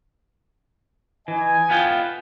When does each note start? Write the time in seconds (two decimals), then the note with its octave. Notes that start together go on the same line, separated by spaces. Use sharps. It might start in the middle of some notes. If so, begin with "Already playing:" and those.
1.28 E3 D#5 G#5
1.70 B3 F4 G5